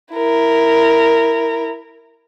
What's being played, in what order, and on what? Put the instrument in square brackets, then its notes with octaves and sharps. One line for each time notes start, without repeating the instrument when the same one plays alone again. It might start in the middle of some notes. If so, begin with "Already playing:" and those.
[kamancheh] E4 A#4